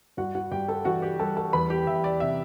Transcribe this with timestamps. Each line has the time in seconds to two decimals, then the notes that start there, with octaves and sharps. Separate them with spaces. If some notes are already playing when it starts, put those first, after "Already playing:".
0.17 G2 F#4 F#5
0.35 F#4 F#5
0.51 G2 G4 G5
0.68 A4 A5
0.85 E3 F#4 F#5
1.02 G4 G5
1.19 G3 A4 A5
1.37 A4 A5
1.53 E2 B4 B5
1.70 G4 G5
1.87 E2 E5
2.04 D5
2.20 C3 E5